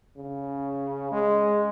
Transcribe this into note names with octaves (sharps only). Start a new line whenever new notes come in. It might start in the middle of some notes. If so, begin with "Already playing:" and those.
C#3
G#3